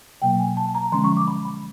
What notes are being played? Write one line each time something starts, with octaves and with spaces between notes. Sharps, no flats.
B2 F#3 A#3 G5
G#5
A5
A#5
D3 F3 G#3 C#4 C6
C#6
D6
B5
B5